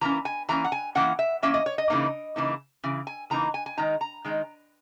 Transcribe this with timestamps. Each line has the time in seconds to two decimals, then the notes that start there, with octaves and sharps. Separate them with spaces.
0.01 E3 A#3 C#4 A#5
0.25 G#5
0.49 E3 A#3 C#4 A#5
0.65 F#5
0.72 G#5
0.95 E3 A#3 C#4 F#5
1.19 E5
1.42 E3 A#3 C#4 E5
1.54 D#5
1.66 C#5
1.78 D#5
1.90 C#3 E3 A#3 D#4
2.36 C#3 E3 A#3 D#4
2.84 C#3 E3
3.07 G#5
3.30 C#3 E3 A#3 D#4 A#5
3.54 G#5
3.66 G#5
3.77 D#3 G#3 D#4 A#5
4.01 A#5
4.25 D#3 G#3 D#4